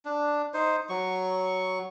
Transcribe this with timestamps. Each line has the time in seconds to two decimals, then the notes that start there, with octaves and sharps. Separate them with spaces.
0.05 D4
0.54 D#4 C5
0.89 F#3 C#6